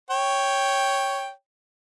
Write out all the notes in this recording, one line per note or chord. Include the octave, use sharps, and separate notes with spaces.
C#5 G5